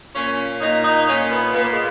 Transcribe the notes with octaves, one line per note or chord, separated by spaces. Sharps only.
A#2 C#4
A#2 D#4
D#4
A#2 C#4
B3
A#2 B3
A#3
G#3